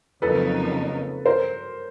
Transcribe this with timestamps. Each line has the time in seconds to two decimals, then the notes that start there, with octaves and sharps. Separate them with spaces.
0.22 F2 C#3 F#3 A#3 D#4 A4 B4
1.26 A#4 C5